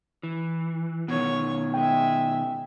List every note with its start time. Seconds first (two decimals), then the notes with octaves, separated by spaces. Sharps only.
0.23 E3
1.08 B2 D#3 C#5
1.74 G#3 E5 G5